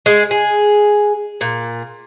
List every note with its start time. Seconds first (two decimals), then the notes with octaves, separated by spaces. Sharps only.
0.06 G#3
0.31 G#4
1.41 A#2